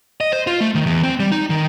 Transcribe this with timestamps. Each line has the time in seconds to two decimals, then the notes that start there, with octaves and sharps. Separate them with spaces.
0.21 D#5
0.32 C5
0.47 F4
0.61 A3
0.75 D#3
0.86 E2
1.03 C4
1.20 G3
1.32 D#4
1.50 D#3